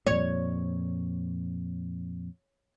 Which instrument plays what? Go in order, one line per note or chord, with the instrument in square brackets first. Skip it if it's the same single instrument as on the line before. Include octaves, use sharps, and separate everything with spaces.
[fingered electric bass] F2 A#2 [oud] C#5